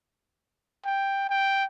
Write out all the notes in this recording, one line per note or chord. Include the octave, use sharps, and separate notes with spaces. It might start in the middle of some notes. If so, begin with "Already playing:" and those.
G5
G5